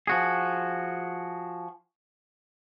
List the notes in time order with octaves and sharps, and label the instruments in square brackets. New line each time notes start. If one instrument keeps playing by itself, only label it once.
[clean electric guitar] F3 F#4 G#4